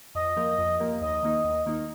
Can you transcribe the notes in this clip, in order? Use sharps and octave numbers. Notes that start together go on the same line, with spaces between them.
F2 D#5
F3 A#3 G4 A#4
F2
F3 A#3 G4 A#4
D#2 D#5
D#3 A#3 D#4
D#2
D#3 A#3 D#4